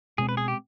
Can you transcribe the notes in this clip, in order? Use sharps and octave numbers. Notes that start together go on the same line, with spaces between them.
B2 G#3 C4 G#4
B4
G#4
G4